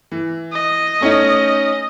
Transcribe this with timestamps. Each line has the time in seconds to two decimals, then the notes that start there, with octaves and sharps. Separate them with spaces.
0.12 E3
0.53 D#5
1.00 A3 C#4 D#4